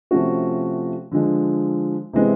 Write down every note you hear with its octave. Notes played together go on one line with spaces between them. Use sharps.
C3 F3 A3 C#4 F#4
D3 F3 G#3
C3 E3 G#3 B3